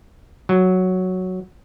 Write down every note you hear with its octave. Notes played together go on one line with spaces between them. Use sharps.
F#3